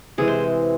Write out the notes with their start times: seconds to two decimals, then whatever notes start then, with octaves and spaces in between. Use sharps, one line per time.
0.18 C3 E3 G#3 G#4
0.28 C5